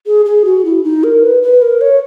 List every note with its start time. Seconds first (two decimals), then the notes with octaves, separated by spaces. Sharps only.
0.06 G#4
0.25 G#4
0.45 F#4
0.65 E4
0.84 D#4
1.04 A#4
1.22 B4
1.43 B4
1.62 A#4
1.81 C#5